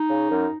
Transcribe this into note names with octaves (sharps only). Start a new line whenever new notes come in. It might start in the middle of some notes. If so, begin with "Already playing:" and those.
Already playing: D#4
C#3
F#2